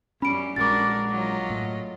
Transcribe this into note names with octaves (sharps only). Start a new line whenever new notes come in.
F#2 G3 C#4 B5 D7
A#1 G#3 D4 F#4 A#4 D6 A6
F#3 F4 D#5
A2